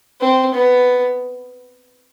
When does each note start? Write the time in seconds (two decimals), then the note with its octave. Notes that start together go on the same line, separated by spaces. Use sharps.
0.20 C4
0.54 B3